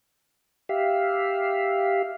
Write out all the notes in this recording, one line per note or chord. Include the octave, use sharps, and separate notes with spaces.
G4 E5 F5